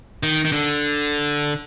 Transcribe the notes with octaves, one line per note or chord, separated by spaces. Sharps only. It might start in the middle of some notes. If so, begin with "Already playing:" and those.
D#3
D#3
D3